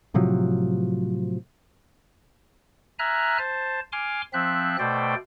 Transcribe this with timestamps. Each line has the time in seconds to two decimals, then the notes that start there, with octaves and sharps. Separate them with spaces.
0.14 A2 C3 F3 F#3
2.99 E5 G#5 A#5 F6 F#6
3.38 C5 A5
3.92 G#5 C6 D6 F6
4.33 F3 C4 E5 F#6
4.79 B2 A3 C5 D5 G5